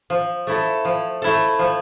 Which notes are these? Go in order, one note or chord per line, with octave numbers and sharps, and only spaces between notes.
F3
A3 E4 A4
F3
A3 E4 A4
F3